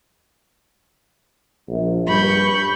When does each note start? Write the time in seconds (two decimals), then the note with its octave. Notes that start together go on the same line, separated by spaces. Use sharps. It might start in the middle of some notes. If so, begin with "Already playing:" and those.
1.68 A#1
2.08 G2 B5 C#6 G6